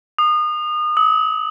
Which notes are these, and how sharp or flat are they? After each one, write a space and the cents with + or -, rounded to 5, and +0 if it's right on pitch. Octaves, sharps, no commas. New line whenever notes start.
D#6 -30
D#6 +45